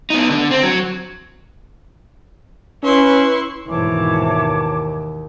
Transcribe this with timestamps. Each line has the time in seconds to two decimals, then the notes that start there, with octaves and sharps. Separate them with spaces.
0.10 B3 D#4
0.31 D3
0.51 C4
0.63 F#3
2.83 C#4 E4 B4 C6 C#6
3.68 D#2 G#2 B2 E3 C#5 A5 D6